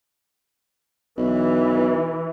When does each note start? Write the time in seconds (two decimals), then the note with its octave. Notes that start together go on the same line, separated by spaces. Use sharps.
1.17 B1 E3